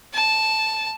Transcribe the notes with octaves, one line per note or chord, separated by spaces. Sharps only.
A5